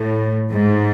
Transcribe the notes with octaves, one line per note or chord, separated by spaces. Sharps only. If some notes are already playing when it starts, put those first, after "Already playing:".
Already playing: A2
G#2